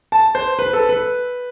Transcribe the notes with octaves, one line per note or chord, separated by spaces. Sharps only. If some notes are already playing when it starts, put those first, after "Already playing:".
A5
C5
B4
A4
B4